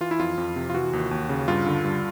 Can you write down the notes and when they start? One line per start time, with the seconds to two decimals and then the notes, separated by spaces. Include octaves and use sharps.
0.01 E3 F4
0.11 E4
0.19 F2 F4
0.38 F2
0.56 C3
0.70 F4
0.74 E3 F#4
0.93 D#2
1.11 D#2
1.29 C#3
1.48 G2 F4
1.67 D3
1.84 G2